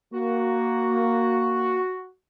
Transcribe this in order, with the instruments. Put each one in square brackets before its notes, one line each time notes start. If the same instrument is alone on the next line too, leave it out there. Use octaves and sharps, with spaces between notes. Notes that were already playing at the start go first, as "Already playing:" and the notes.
[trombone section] A#3 [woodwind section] F#4